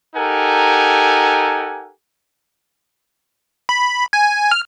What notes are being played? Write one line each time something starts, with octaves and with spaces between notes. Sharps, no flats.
D#4 G4 A4 A#4 F#5 G#5
B5
G#5
F6